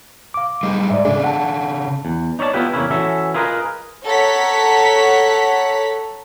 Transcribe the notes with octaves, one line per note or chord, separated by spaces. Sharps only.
F5 D6
G3 G#3 D#4
G#2 D5 E5
C#3 D4 G#4 D5
F#5 A5
E2
D#4 C#5 D5 E5 A5
B3 E4 F4 G4 B4
E2 C#3 A#3 C#4 E4
E3 C#4 F#4 A4 E5
E4 F4 G#4 A#4 B4 D#5
A4 C#5 F#5 A#5 B6